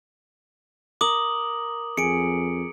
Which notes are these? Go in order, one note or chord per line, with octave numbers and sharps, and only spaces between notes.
A#4 D6 D#6 F#7
F2 G#4 C#7 D7